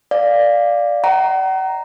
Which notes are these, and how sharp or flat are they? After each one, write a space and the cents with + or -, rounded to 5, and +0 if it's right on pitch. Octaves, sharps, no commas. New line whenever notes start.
D5 +0 F5 +0
D#5 +35 F#5 +40 A#5 +0